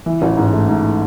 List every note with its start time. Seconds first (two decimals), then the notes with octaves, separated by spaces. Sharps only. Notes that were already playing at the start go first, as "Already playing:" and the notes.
0.06 E3
0.22 A1
0.37 G#2
0.53 A3
0.69 G#2